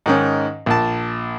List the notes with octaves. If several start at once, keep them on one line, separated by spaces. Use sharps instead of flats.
G#2 D#3 C#4
A#1 A5